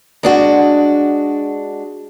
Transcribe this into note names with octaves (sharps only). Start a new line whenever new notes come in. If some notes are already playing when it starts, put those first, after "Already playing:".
G#3 D4 F#4